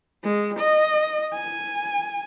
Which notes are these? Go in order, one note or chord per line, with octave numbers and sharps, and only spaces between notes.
G#3
D#5
G#5